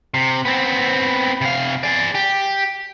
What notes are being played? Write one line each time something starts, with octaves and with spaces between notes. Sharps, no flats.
C3
B3 C4
C3 F5
G#4 D5
G4